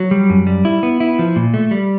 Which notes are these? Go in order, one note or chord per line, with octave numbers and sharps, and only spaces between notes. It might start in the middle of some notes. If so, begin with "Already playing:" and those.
Already playing: F#3
G3
F#2
G3
E4
B3
E4
F3
A#2
A3
G3